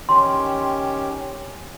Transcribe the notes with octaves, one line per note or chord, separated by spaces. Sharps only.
D#3 C#4 G4 C6